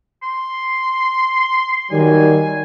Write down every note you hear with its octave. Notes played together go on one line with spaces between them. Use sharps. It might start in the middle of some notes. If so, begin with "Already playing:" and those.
C6
D#3 F#3 G3 G#5